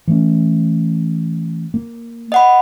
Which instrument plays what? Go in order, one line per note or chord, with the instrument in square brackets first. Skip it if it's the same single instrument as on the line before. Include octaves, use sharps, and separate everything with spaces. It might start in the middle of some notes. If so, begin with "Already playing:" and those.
[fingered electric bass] E3 A3 C#4
A#3
[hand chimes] D#5 F#5 B5